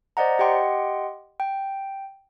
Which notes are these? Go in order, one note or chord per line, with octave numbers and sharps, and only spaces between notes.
C5 D5 D#5 F#5 A#5
G4 D#5 F#5 G5 C6
G5